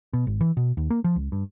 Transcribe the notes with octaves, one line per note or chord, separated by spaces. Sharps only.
B2
G#1
E3
B2
D#2
A#3
F3
C#2
G2